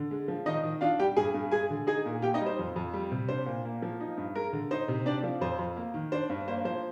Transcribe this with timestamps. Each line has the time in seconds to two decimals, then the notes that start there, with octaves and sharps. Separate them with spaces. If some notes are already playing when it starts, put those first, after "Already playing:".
Already playing: D3
0.11 G#3
0.28 F3
0.46 D#3 D#4 D#5
0.64 D#3
0.81 D4 F4 F5
0.99 G3 G4 G5
1.17 G2 G#4 G#5
1.34 G2
1.51 G#3 G#4 G#5
1.70 D3
1.87 D#4 G#4 G#5
2.06 A#2
2.22 A#3 G4 G5
2.34 D#4 D#5
2.41 G3
2.46 C5
2.59 F2
2.76 F2
2.94 G3
3.12 C3
3.29 D4 C5
3.46 A#2
3.65 A#3
3.82 F3
4.00 D#4
4.18 G2
4.36 G#3 A#4
4.53 D3
4.71 D#4 C5
4.88 C3
5.06 C4 D4 D5
5.24 F3
5.41 F2 C5
5.59 F2
5.77 A#3
5.94 D#3
6.12 D4 C5
6.29 G2
6.47 A#3 C5
6.65 F3 C5